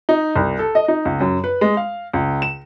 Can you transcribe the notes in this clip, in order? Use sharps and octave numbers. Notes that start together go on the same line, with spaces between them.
D#4
C2
A4
D#5
D#4
C#2
F#2
B4
G#3
F5
C#2
E7